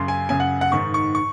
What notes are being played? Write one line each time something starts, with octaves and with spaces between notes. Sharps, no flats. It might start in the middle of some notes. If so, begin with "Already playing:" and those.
Already playing: F#2 C#3 C6
G#5
F#2 C#3 G#5
F#5
F#5
G#2 D#3 C#6
C#6
C#6